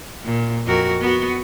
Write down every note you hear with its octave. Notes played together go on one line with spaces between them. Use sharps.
A#2
F2 F#4 A#4
B3 F#4